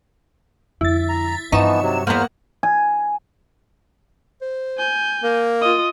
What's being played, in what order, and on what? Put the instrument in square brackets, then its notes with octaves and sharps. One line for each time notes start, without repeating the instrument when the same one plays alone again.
[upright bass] F2 D3 [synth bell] E4 A6
[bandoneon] A#5
[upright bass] G2 [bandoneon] E3 F3 B3 [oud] D#4 [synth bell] C#6 E7
[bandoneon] C3 F#3
[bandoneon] E2 C5 F6 [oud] A#3 B3 [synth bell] F#5 A#5
[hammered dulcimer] G#5
[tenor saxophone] C5
[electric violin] G#5 G6
[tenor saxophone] A#3
[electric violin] F4 D#5